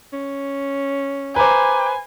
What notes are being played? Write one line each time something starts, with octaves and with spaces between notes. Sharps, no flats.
C#4
B4 C5 G#5 A#5 D6